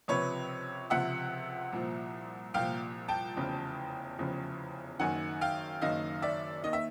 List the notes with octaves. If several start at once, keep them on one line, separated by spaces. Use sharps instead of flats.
C#2 C3 F3 B4 C#5
C#2 C3 F3 E5 F#5
C2 A#2 F3
C2 A#2 F3 F5 G5
G5 A5
F1 E2 C#3 F3
F1 E2 C#3 F3
F#1 F#2 D#3 F#5 G#5
F5 G5
F#1 F#2 D#3 D#5 F5
D5 E5
D#2 D#3 D#5
E5